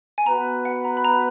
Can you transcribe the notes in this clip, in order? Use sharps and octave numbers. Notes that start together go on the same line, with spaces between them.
G#5
B3 F#4 B4 A#5
F#5
A#5
B5
A#5